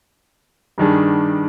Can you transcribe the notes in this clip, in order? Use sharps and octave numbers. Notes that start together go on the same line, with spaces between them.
G2 D#3 G3 D4 G#4